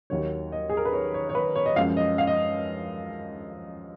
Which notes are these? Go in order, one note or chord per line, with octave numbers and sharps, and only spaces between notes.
D#2 D#3 F#3 A#3 C#5
D#5
G#4
A#4
B4
C#5
C#5
C#5
B4
C#5
D#5
F#2 F3 G#3 F5
D#5
F5
D#5